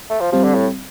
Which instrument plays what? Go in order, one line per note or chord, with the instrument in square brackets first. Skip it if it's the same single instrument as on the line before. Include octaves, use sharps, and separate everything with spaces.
[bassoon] A3
F3
[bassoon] F3 [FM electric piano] G3 C4 G4
[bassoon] D3
A2